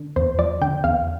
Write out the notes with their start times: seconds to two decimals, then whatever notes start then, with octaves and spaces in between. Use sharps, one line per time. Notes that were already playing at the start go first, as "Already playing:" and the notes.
Already playing: D3
0.16 E2 C5
0.39 F3 D5
0.61 D3 G5
0.84 E2 F5